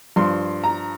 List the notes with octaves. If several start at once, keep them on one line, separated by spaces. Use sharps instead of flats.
G2 F3 C6
A#5